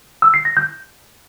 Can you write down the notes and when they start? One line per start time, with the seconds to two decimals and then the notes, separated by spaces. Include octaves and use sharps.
0.22 E6
0.34 C7
0.45 A#6
0.57 G6